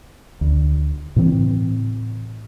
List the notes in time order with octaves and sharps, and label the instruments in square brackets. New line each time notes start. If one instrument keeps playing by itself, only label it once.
[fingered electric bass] D2
A2 C#3 E3 C4